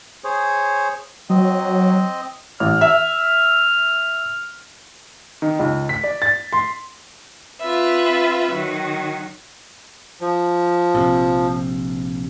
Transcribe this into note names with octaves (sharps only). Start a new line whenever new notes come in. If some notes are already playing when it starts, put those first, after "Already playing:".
G#4 C5 C#5
F#3 C4 D#5
A1 F6
E5
D#3
C#2
B6
D5
A6
C6
C4 F4 B4 E5
D#3 F#3
F3
A#1 C3